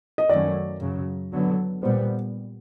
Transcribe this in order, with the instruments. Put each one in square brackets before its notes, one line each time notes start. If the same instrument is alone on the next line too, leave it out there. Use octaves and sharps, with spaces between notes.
[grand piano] D#5
[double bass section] F#2 D#3 F#3 A3 C#4 [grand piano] D5
[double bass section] F#2 C#3 F#3
D3 F#3 B3
[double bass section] A#2 G3 B3 [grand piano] C5